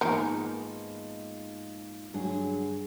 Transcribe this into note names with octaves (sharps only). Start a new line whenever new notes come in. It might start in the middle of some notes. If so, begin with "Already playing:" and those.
G#2 D#3 F3 A#3 B3 D#4 A#4 G#5
G2 D3 F#3 G#4